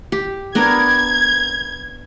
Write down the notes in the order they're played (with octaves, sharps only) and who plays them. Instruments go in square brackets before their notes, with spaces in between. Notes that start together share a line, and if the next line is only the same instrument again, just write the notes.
[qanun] G4
[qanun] B3 D4 A#4 [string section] G#6